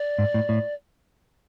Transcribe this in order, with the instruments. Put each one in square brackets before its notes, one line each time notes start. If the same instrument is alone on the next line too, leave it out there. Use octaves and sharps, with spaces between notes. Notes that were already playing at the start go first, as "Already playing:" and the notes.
Already playing: [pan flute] D5
[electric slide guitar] G#2
A2
A2